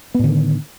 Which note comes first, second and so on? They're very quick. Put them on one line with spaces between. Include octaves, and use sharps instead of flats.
B3 A2 D3 D#3